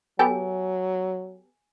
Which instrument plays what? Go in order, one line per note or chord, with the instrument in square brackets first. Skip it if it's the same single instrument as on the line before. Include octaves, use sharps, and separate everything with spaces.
[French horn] F#3 [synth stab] B3 G4 A4 [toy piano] G#5